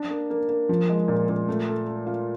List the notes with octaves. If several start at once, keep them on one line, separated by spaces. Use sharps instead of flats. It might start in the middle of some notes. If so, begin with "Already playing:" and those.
Already playing: D4
A#3
A#3
A#3
F3
G#3
A#2
A#2
A3
A4
A4
F4